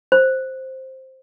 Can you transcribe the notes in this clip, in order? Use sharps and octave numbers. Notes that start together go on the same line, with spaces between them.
C5